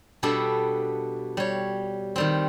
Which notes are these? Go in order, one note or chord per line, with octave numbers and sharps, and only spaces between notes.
B2 G3 B3 D4 A4 A5
G3 C#5
D#3 G3 C4